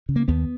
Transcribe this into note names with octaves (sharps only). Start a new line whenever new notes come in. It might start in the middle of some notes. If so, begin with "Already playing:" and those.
C#3
A#3
D#2 B3